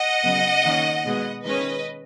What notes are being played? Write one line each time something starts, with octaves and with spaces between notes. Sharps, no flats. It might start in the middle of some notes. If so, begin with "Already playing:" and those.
Already playing: D#5 F#5
C#3 F#3 B3
D#3 A#3 C#4
B2 G#3 B3
D#3 G#3 C#4 B4 D#5